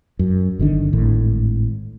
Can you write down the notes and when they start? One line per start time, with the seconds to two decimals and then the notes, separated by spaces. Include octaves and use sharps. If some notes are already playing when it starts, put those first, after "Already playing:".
0.19 F#2
0.59 G1 D3 D#3 D4
0.93 G#1 A2